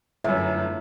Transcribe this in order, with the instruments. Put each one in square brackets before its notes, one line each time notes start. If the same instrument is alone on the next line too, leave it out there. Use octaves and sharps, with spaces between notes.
[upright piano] G1 F#2 [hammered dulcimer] A2 [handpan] E5